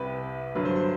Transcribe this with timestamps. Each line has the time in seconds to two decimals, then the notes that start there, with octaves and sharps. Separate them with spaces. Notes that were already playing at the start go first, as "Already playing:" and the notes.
Already playing: C2 C3 G3 B4
0.55 G2 D3 F#3 B4
0.65 C5
0.76 C5